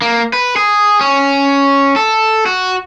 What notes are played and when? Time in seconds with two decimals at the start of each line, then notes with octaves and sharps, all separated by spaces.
0.02 A#3
0.33 B4
0.56 G#4
1.01 C#4
1.96 A4
2.46 F#4